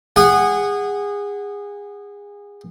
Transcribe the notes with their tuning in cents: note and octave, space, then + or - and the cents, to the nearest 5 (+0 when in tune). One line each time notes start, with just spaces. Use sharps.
G#4 -25 F#5 +0